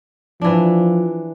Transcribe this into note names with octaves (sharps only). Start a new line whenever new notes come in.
E3 F3 D4